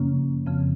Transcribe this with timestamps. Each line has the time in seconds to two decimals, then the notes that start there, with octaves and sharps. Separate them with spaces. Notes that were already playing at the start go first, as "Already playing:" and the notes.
Already playing: F#2 C#3 F3 A#3 C#4
0.46 F2 C#3 F3 C4